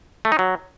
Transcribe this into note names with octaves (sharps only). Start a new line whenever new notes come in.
A3
D#4
F#3